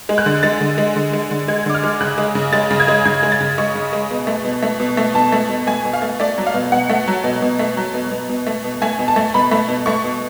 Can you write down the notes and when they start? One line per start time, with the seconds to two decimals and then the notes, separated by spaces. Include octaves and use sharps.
0.09 G#3
0.18 F#6
0.26 D3
0.43 G#3 A6
0.61 D3
0.78 G#3
0.96 D3
1.13 G#3
1.31 D3
1.48 G#3 G#6
1.66 D3 D6
1.75 F6
1.83 G#3
2.01 C#3 F#6
2.18 G#3
2.35 C#3
2.53 G#3 A6
2.71 C#3
2.80 G#6
2.88 G#3
3.05 C#3 G#6
3.23 G#3
3.32 A6
3.41 C#3
3.58 G#3 C#6
3.75 C#3
3.93 G#3
4.11 B2
4.27 A3
4.45 B2
4.63 A3
4.80 B2
4.97 A3
5.14 B2 A5
5.32 A3
5.49 B2
5.67 A3 G#5
5.85 B2
5.93 F5
6.02 A3
6.20 A3 D5
6.38 F#3
6.47 F5
6.54 B2
6.72 B2 F#5
6.90 A3
7.08 F#3
7.24 B2
7.42 B2
7.59 A3
7.77 F#3
7.94 B2
8.11 B2
8.29 B2
8.47 A3
8.64 B2
8.82 A3 G#5
8.99 B2
9.08 A5
9.16 A3
9.34 B2 B5
9.51 A3
9.69 B2
9.86 A3 C#6
10.04 B2